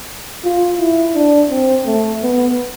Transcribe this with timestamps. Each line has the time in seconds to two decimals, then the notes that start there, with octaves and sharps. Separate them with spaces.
0.44 F4
0.79 E4
1.15 D4
1.50 C4
1.86 A3
2.22 B3